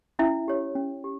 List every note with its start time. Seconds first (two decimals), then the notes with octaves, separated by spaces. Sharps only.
0.19 C#4 E4 E5
0.48 G4 C#5
0.75 C#4
1.04 G4